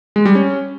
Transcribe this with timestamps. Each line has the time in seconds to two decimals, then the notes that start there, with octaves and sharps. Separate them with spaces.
0.16 G#3
0.26 G3
0.35 C#4